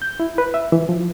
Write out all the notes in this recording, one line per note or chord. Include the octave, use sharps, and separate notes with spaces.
G6
E4
B4
E5
E3
F3